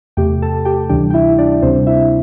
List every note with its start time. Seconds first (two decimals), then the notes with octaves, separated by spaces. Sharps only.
0.17 E2 C3 A3 G4 G5
0.42 A4 A5
0.65 G4 G5
0.89 D2 C3 E3 G3 D4 G4 G5
1.10 G5
1.14 E4 E5
1.38 D4 D5
1.62 D2 C3 G3 C4 D4 C5
1.87 E4 E5